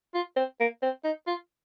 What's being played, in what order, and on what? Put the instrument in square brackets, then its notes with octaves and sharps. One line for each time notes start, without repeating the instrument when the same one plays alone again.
[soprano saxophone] F4
C4
A#3
C4
D#4
F4